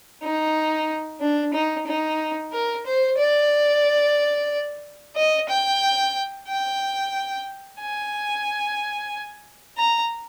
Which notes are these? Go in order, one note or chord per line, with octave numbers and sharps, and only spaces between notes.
D#4
D4
D#4
D#4
A#4
C5
D5
D#5
G5
G5
G#5
A#5